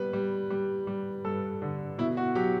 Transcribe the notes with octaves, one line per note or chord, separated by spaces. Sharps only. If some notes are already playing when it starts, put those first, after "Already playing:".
Already playing: G3 B3 B4
G3
G3
G3
G2 A4
D3
B2 E4
F#4
F#3 G4